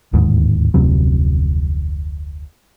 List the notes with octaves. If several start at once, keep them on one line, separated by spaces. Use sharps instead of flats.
D1 D#2 G#2
F1 D2 C3 F#3